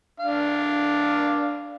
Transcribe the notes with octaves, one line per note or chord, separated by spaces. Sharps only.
D4 F5